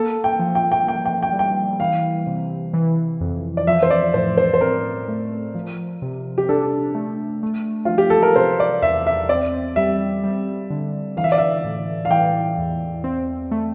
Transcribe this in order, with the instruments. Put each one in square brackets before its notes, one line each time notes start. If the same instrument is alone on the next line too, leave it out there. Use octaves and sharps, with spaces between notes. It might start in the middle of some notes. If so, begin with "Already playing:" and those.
Already playing: [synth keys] A#3 [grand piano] A4
[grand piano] G5
[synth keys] F3
[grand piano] G5
G5
[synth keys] A#3 [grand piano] G5
[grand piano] G5
G5
[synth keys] G3
[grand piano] G5
[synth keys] E3 [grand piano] F5
[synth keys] C3
E3
F2
[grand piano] D5
[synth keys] F3 [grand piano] E5
[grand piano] C5
D5
[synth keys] A2 [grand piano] C5
[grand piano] C5
C5
[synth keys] C4 [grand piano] A#4
[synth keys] A3
F3
C3
[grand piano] G4
[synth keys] D4 [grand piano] A4
[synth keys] A3
A3
[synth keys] F3 [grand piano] F4
[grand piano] G4
A4
A#4
[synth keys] C3 [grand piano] C5
[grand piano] D5
[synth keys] E2 [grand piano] E5
[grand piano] E5
[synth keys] C4 [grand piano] D5
[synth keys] G3 [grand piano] E5
[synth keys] G3
D3
[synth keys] E3 [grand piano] F5
[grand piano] E5
D5
E5
[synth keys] A2
[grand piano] F5
[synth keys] E3 [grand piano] G5
[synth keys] E2
C4
A3